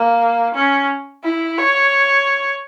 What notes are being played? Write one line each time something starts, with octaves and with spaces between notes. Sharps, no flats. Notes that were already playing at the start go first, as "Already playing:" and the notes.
Already playing: A#3
C#4
E4
C#5